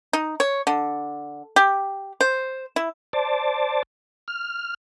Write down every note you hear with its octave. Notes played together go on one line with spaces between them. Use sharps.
D#4
C#5
D3
G4
C5
E4
C5 D5 A5
F6